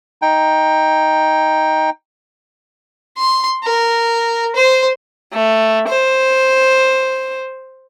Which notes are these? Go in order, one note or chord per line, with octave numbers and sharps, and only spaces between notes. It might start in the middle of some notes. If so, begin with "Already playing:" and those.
D#4 G5
C6
A#4
C5
A3
C5